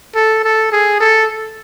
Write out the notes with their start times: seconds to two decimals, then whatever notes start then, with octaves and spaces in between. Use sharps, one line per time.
0.15 A4
0.44 A4
0.72 G#4
1.00 A4